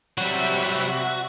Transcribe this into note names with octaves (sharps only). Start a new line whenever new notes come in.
C3 F#3 G3 F#4 E5